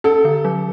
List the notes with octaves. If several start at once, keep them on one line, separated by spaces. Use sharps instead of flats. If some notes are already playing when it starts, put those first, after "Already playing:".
C#4 A4
D3
F#3